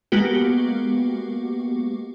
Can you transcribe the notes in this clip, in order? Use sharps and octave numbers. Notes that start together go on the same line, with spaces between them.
G#3 A#3 B3 F#4 G4